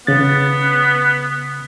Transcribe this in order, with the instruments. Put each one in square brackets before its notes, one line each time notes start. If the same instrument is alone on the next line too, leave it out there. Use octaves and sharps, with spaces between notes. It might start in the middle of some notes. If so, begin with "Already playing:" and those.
[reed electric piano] C#3 A6 [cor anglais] B3